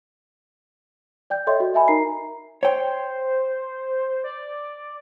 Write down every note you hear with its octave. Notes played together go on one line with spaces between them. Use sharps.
D5 G5 G6
A4 C#5 D#5 E5 C6
F#4
D#5 E5 G#5 B5
D#4 A#4 A#5 C7
C5 C#5 G5
D5